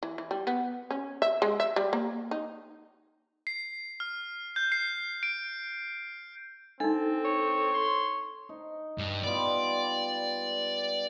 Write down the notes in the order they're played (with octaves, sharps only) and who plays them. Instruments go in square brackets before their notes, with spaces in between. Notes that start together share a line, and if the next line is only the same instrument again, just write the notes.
[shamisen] E3
E3
G3
B3
C#4
E5
G#3
E5
G3
A#3
D#4
[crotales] C7
F6
G6
C7
D7
[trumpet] C4 [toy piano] D4 D#4 [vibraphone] A4
[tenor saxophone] C#5
[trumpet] C6
[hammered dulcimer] D#4
[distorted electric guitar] G2
[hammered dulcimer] G3 B3 F4 [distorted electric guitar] D5